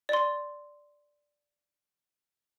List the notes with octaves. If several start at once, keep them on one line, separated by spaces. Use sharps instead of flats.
D5 C6